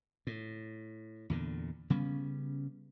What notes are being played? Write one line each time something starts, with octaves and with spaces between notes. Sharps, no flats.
A2
E2 A#2 D3
C#3 G3 B3 C#4